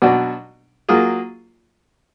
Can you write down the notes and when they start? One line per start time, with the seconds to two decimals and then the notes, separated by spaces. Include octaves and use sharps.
0.02 B2 F#3 D4 F#4 D5
0.89 F#3 A#3 F4 G#4